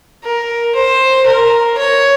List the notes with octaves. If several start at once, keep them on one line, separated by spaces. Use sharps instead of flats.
A#4
C5
A#4
C#5